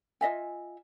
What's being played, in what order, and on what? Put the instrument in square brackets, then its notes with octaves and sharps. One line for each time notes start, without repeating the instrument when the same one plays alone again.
[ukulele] F4 D#5 E5 G#5